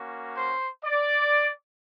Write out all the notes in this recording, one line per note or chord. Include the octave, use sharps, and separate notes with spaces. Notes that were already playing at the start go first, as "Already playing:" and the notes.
Already playing: A#3 C#4 F#4
C5
D5